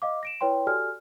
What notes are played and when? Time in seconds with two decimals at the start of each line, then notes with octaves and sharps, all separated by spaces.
0.02 D#5 F5 D6
0.23 A#6 D7 E7
0.41 E4 B4 C#5 G5 C6
0.67 F#4 G4 A4 D5 G#5 F6